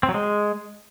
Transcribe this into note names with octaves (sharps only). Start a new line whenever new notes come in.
C4
F#3
G#3